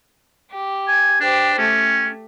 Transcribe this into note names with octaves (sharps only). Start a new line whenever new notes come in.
G4
G#5
D4 G4 C5
A3 C#4